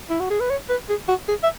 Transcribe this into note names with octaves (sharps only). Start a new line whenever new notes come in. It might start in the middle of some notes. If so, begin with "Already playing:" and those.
E4
F#4
G#4
B4
C#5
B4
G#4
F#4
G#4
E5